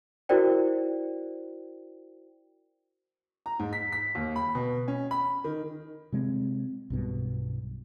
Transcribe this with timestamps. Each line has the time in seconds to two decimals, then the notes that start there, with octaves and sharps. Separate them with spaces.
0.29 E4 F#4 A#4 C5 D5 G5
3.46 A#5
3.59 G#2
3.73 B6
3.92 B6
4.15 D#2
4.36 B5
4.55 B2
4.88 C#4
5.11 B5
5.44 D#3
6.12 C3 G#3 A3 C4
6.90 B1 G2 B2